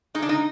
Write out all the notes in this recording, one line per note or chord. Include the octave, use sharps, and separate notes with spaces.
G#3 D#4
D4
D#4